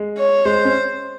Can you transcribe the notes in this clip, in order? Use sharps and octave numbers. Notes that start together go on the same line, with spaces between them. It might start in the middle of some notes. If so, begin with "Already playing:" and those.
Already playing: G#3
C#5
G#3 C5
C#4